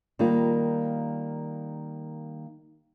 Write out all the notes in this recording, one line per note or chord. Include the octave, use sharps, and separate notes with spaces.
D#3 G3 A#3 F4